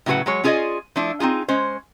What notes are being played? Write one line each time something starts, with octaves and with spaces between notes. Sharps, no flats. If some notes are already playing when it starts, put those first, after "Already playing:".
A2 C#3 F#3 F4 B4 F#5
F#3 G#3 C#5
C#4 F4 G#4 B4 D5 D#5
F3 A3 D4 E4
C4 D#4 F4 G#4
G#3 C#4 C5